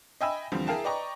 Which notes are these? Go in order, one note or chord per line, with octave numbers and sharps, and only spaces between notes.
D#5 E5 G5 G#5 B5 E6
E2 D3 F3 G3 C4
E4 G#4 A#4 F5 G5 A5
B4 D5 D#5 G5 A#5 C#6